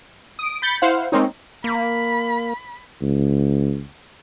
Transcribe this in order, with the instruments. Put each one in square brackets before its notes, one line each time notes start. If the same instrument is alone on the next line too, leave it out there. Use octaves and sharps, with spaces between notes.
[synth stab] D#6 D7
B5 G6 A6 B6 C#7
E4 C5 F5 F#5
G#3 A#3 C4 C#4 D#4
[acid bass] A#3 [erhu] B5
[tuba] C#2